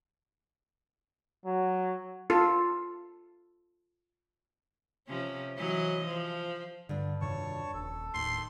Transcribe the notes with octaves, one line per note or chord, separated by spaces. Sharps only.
F#3
F4 A4
C3 F3 C#4
E3 F#3 D#5
F3
G2 D3 D4
F2 C3 D#3 C#5 A5 C#6
D#1 A4
D#1 A2 D#3 C6